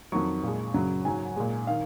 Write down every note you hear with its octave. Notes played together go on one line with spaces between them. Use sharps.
F2 D#3 F#3 C#6
A#2 G#3
F#2 C#3 F#3
G#2 F#3 G#5
A#2 G#3
D#3 F5